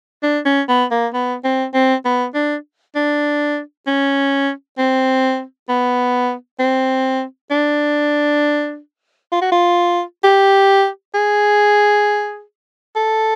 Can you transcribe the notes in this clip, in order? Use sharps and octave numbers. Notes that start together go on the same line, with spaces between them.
D4
C#4
B3
A#3
B3
C4
C4
B3
D4
D4
C#4
C4
B3
C4
D4
F4
F#4
F4
G4
G#4
A4